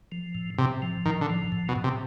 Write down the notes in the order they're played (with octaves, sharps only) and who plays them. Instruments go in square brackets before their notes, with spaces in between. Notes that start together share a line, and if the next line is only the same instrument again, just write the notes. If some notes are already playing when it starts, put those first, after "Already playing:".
[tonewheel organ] F3
A2
[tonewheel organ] A2 [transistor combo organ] C3
[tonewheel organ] F3
[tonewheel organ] A2 [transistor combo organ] D#3
[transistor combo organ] D3
[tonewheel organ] F3
A2
[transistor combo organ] B2
[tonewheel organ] A2
[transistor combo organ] C3